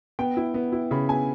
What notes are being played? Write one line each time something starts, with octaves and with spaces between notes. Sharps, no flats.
B3 G5
E4
B3
E4
C#3 B5
B3 G#5